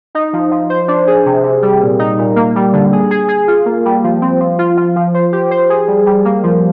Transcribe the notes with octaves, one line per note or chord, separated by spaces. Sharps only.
D#4
F3
F3
C5
D4
G#4
C3
C3
G3
A#2
D#4
A#2
A#3
G3
D3
G#4
G#4
G#4
F4
A#3
G3
F3
C4
F3
F4
F4
F3
C5
G4
C5
G#4
G3
G3
A#3
F3